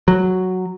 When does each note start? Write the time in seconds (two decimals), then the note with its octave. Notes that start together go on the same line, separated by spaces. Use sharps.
0.08 F#3